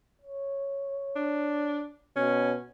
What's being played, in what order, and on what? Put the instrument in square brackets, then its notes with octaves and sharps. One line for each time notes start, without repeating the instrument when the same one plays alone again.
[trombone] C#5
[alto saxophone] D4
[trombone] B2 [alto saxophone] C#4